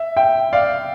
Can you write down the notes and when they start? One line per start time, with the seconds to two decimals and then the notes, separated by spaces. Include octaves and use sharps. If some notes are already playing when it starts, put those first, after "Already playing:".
Already playing: E5
0.16 E5 G5
0.53 D5 F5